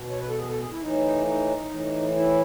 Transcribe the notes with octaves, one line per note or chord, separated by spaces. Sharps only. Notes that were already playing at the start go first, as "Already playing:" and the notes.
Already playing: B2
C#5
B4
A4
G#4
A4
G#4
E4
A2 E3 D#4
D#4
A2 E3
E4